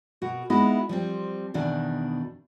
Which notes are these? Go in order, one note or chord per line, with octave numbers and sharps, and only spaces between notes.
B2 F#4 A#4
G#3 B3 D#4 E4 F#4
F3 G3 C4
E2 B2 D#3 D4